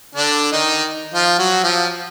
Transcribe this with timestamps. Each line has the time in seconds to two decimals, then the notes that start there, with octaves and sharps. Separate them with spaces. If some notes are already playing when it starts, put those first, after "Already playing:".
0.15 D3 D4
0.52 D#3 D#4
1.14 F3 F4
1.38 F#3 F#4
1.63 F3 F4